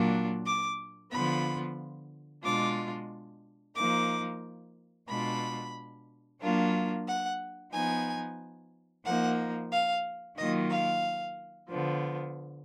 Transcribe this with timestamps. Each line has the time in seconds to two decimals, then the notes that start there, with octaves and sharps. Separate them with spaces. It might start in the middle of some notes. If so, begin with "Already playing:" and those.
Already playing: A#2 F#3 A#3 D4 F4
0.46 D6
1.11 D3 F3 B3 F4 B5
2.44 B2 G#3 D4 F4 D6
3.76 F3 A#3 D#4 D6
5.09 B2 G#3 D4 F4 B5
6.41 F#3 A#3 D4 F4
7.07 F#5
7.73 F3 B3 D#4 G#5
9.05 F3 A#3 D#4 F#5
9.71 F5
10.37 D#3 F#3 A#3 F4 D#5
10.71 F5
11.70 D3 F3 B3